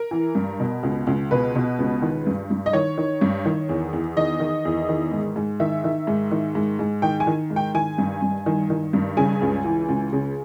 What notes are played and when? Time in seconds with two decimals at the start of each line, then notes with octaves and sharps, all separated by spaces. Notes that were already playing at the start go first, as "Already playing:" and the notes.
Already playing: A#4
0.11 E3
0.35 G2
0.60 B2
0.83 C#2
1.07 C#2
1.31 B2 B4
1.55 B2
1.79 C#2
2.02 D#3
2.26 G2
2.50 G2
2.66 D#5
2.73 D#3 C#5
2.98 D#3
3.21 G2
3.45 D#3
3.69 E2
3.93 E2
4.17 D#3 D#5
4.40 D#3
4.65 E2
4.89 D#3
5.12 G#2
5.36 G#2
5.60 D#3 E5
5.84 D#3
6.07 G#2
6.31 D#3
6.55 G#2
6.79 G#2
7.02 D#3 G5
7.20 G#5
7.27 D#3
7.50 G#2
7.56 G5
7.75 D#3 G#5
7.98 G2
8.22 G2
8.46 D#3
8.70 D#3
8.93 G2
9.17 C#3 G#5
9.41 C#2
9.65 E3
9.88 C#2
10.13 C#3